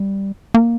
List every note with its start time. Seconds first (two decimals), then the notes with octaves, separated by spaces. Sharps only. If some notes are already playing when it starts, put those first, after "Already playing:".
Already playing: G3
0.54 A#3